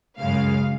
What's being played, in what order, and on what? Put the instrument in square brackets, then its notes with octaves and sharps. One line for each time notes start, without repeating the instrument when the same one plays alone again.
[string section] F#2 C#3 G#3 F5